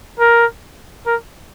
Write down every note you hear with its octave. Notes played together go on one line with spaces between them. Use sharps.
A#4
A#4